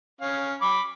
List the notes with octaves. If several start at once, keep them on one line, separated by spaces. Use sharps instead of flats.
C#4 F5
B5 D6